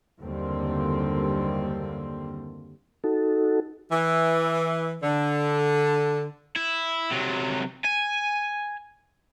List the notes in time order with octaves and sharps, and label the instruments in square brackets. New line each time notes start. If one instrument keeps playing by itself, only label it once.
[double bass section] F#1 D#2 D3 G3 A#3 C4
[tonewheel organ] D#4 F#4 A4
[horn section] E3
D3
[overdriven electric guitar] E4
C3 F#3
G#5